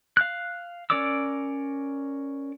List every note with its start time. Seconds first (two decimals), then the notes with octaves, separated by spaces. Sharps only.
0.17 F5 F#6
0.90 C#4 A#4 D5 D6 E6